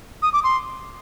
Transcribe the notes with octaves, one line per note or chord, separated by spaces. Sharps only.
D#6
D6
C6